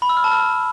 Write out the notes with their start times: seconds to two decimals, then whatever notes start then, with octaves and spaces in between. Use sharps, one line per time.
0.02 B5
0.09 E6
0.17 F6
0.24 A5
0.32 F6